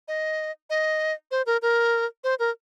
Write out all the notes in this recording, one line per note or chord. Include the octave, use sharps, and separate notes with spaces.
D#5
D#5
C5
A#4
A#4
C5
A#4